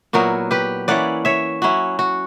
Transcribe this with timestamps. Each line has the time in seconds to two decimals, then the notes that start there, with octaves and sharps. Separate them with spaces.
0.13 A#2 F#3 B3 E4 F#4 A#4
0.51 G4 B4
0.88 E3 A#3 C#4 E4 D5 F#5
1.25 C#5 E5
1.62 F#3 C#4 E4 F#4
1.99 F#4